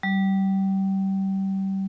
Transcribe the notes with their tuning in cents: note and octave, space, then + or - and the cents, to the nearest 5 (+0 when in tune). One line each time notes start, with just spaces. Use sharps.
G3 -25